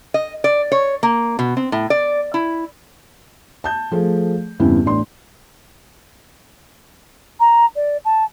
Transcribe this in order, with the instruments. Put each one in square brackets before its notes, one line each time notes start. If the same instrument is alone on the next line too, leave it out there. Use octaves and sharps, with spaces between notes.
[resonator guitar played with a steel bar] D#5
D5
C#5
A#3
B2
C4
A2
D5
E4
[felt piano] A5 G6
F3 A3 G#4
E2 G2 C#3 C4 E4
A1 D4 C6
[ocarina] A#5
D5
A5